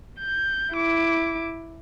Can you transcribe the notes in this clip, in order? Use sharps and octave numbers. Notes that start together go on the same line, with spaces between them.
G6
E4 D6